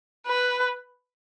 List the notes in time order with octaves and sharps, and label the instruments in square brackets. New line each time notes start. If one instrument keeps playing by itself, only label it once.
[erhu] B4